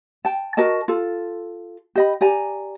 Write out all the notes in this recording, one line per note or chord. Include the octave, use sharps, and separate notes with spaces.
G5 A5
F#4 A#4 D#5 A5
F4 A4
G4 D#5 B5
G4 D5 G#5 A#5